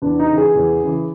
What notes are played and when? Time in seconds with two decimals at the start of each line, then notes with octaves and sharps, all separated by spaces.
0.02 E2 D4
0.19 D#4
0.28 C#3 E3
0.38 G#4
0.55 E2
0.83 C#3 E3